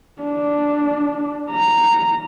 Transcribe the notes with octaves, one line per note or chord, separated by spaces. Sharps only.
D4
A#5